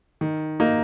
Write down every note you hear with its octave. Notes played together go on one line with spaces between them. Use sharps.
D#3
A#3 D#4